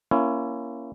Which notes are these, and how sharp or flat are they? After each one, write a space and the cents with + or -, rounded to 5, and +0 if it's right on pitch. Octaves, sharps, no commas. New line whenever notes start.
A#3 +15 C#4 +0 E4 +30